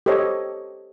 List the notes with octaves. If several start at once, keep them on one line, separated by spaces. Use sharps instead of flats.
G4 A4 C5 C#5 D#5